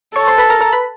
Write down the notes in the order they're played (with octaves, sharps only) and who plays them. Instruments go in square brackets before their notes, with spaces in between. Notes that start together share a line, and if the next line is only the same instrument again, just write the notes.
[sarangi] A4 [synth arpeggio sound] C#5 C#6
[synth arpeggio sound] C5 C6
B4 B5
A#4 A#5
A#4 A#5
B4 B5